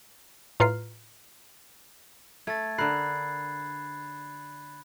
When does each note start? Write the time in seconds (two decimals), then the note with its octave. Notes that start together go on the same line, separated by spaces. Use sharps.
0.60 A2 F4 B4 A#5 F6 C7
2.47 A3 G#6 A6
2.78 D3 A#4 B5 F#6 C7